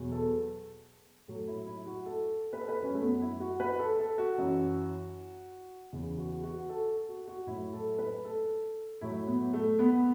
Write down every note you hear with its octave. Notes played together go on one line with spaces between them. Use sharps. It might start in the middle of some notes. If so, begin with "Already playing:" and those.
Already playing: E2 B2 F#3
A4
A2 F#3 A4
E4
E4
F#4
A4
B4
A4
B4
F#2 F#3 C#4
A3
B3
E4
F#4
B4
A4
A4
F#4
F#2 E3
E2 C#3 E3
F#4
F#4
A4
F#4
F#4
A2 F#3 E4
A4
B4
A4
A2 F#3 E4
B3
A3
B3